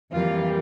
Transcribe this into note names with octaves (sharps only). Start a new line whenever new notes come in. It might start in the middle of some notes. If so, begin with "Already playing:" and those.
F2 E3 G3 A#3 F4